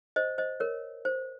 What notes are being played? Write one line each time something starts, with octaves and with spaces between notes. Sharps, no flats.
C5 D#5
C5 D#5
A#4 C#5
C5